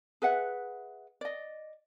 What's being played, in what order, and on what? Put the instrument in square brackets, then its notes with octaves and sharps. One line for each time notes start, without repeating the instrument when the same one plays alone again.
[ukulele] G#4 B4 E5 F#5
D5 D#5